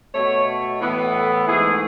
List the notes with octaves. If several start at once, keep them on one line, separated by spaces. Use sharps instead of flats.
B2 A3 C#5
A2 E3 B3
A4
G#2 E3 A3 G#4